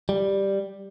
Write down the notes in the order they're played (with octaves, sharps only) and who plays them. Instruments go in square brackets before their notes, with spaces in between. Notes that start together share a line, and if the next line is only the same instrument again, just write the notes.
[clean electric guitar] G3